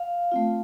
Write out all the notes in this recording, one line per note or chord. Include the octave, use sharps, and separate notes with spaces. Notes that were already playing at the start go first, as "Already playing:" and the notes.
Already playing: F5
A3 C4 F4